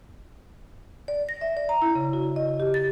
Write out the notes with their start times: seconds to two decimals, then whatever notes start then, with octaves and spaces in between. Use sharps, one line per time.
1.08 D5
1.29 A#6
1.41 E5
1.57 D5
1.69 A#5
1.82 E4
1.95 C#3
2.13 F#4
2.36 D#5
2.60 G4
2.74 A6